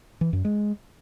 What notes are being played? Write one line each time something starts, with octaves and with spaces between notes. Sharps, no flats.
E3
F#2
G#3